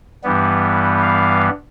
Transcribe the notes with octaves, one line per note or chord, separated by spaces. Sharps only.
G2 E3 G3 B3
F5